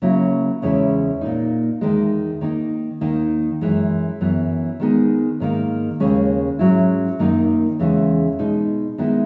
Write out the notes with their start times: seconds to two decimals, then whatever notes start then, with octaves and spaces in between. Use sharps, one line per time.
0.02 C#3 F#3 A#3 E4
0.62 E2 C#3 G#3 C#4 E4
1.21 A#2 A#3 D#4
1.81 E2 D#3 G#3
2.41 D#3 A#3 D#4
3.01 D#2 D#3 A#3 D#4
3.61 F#2 E3 G#3
4.21 F#2 E3 B3
4.80 D#3 G#3 B3 D#4
5.40 G#2 D#3 A#3
6.00 D#2 C#3 G#3 C#4
6.59 G#2 F#3 C#4 E4
7.19 F#2 D#3 A#3 D#4
7.79 E2 C#3 E3 G#3
8.39 B2 G#3 D#4
8.98 D#3 G#3 B3 E4